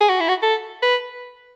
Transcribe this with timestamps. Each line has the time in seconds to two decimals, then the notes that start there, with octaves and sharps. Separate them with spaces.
0.01 G#4
0.10 F#4
0.20 E4
0.29 F#4
0.42 A4
0.83 B4